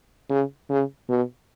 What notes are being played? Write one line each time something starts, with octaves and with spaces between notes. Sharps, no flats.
C#3
C#3
B2